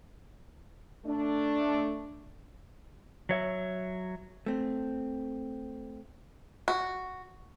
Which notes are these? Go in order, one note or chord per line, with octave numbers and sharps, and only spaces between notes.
A3 D4
F#3 C#5 E5
A3 C4
F#4